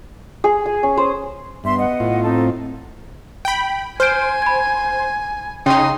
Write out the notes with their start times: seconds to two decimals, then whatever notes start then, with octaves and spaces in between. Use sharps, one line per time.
0.44 G#4
0.66 G#5
0.83 C#4
0.97 C5
1.64 G2 B3 E5 C6
1.78 D#5 F#5
2.00 A2 F4
2.22 C4 D#4 A4
3.45 G5 B5
4.00 C5 G#5 F6 G6 D7
4.42 B5 G#6
5.66 C#3 D#4 G5 C6 D#6